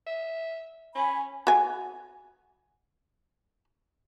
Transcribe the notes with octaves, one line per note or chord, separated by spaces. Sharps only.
E5
C#4 G#5 B5
F#4 G#5